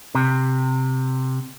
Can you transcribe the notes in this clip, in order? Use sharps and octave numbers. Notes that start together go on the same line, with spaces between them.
C3